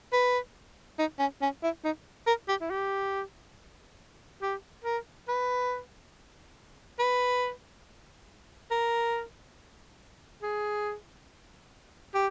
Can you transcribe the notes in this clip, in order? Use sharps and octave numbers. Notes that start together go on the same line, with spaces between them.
B4
D#4
C#4
C#4
E4
D#4
A#4
G4
E4
G4
G4
A#4
B4
B4
A#4
G#4
G4